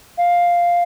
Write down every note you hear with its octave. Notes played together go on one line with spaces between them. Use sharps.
F5